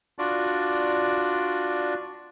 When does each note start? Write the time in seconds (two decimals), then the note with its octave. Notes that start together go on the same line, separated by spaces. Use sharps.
0.19 D4 F4 F#4 D5